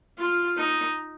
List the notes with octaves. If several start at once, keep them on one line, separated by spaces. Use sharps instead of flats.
F4
D#4